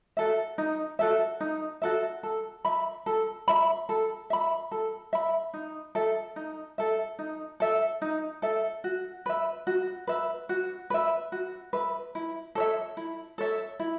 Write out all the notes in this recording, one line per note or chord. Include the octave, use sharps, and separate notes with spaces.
F#4 A4 E5
D#4
F#4 A4 E5
D#4
F#4 A4 E5
A4
E5 B5
A4
E5 B5
A4
E5 B5
A4
E5 B5
D#4
A4 E5
D#4
A4 E5
D#4
A4 E5
D#4
A4 E5
F#4
B4 E5
F#4
B4 E5
F#4
B4 E5
F#4
B4 E5
E4
A4 C#5 E5
E4
A4 C#5 E5
E4